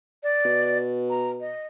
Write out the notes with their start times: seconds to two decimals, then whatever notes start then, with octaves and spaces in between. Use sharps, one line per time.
0.23 D5
0.45 B2
1.10 A#5
1.40 D#5